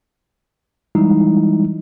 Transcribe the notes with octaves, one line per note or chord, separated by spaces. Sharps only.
E3 G3 G#3 D#4 E4